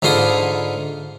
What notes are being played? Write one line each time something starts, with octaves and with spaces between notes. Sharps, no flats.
G#2 D3 E4 F4 C6 D#6